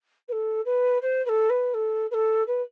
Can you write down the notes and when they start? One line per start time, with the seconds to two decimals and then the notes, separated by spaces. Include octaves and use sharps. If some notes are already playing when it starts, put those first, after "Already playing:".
0.28 B4
0.32 A4
0.65 B4
1.02 C5
1.25 B4
1.29 A4
1.49 B4
1.74 A4
2.10 B4
2.14 A4
2.47 B4